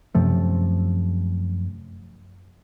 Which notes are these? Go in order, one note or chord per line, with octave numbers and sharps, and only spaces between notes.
F#2 C3 F3 A3